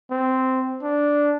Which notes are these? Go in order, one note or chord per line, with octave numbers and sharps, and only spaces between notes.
C4
D4